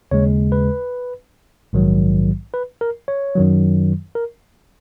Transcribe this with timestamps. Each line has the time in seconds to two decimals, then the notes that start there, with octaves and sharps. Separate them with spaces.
0.11 D#2 C#3 G#3 C#5
0.52 B4
1.73 A#1 G#2 D#3 F#3
2.54 B4
2.81 A#4
3.08 C#5
3.35 F#2 D#3 F#3
4.15 A#4